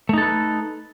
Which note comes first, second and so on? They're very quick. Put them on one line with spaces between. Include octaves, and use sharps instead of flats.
A3 D#4 A4 B4